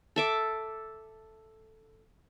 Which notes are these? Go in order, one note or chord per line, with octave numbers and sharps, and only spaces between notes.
A4 E5 D6